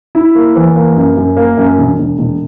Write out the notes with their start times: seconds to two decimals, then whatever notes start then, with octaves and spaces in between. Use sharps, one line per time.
0.15 E4
0.35 A#3
0.56 E2
0.76 A#3
0.96 F#2
1.17 F#2
1.36 A#3
1.57 F#2
1.78 E1
1.98 E1
2.19 E1